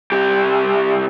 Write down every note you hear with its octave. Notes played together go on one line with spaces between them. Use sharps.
C2 G4